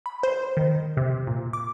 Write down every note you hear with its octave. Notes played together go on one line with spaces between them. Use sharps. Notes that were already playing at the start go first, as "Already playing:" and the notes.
B5
C5
D#3
C3
A#2
D6